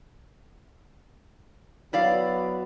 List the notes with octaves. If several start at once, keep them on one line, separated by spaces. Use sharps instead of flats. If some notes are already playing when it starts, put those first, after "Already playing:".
F#3 B3 E4 D5 F5